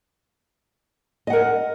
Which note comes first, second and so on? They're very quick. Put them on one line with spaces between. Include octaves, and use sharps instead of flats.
D#5 F#5 A#4